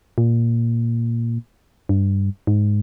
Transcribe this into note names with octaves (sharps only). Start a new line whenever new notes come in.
A#2
G2
G#2